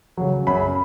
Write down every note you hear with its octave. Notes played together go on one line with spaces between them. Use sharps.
C#3 F#3
F#2 B5